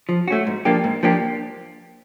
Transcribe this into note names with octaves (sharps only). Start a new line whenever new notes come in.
F3
A3 C#4 F#4
G#2
F3 A#3 D4 G4
G#2
F3 A#3 D4 G4